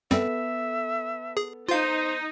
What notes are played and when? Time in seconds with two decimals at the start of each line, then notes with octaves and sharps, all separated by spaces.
0.11 F#2 G3 B3 C4 A4 E5
1.37 G#4
1.69 D#4 F4 C5 F5